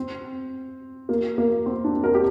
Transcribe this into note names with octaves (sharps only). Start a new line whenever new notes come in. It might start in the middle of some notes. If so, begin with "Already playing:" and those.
Already playing: C4
A#3
A#3
C4
D4
A#4
G4